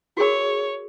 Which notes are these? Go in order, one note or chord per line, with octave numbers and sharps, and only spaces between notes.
F#4 G#4 A#4 C#5